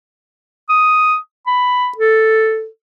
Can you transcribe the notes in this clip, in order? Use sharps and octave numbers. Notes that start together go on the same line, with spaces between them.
D#6
B5
A4